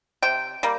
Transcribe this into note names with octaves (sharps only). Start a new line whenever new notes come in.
C3 G5
G3 A#3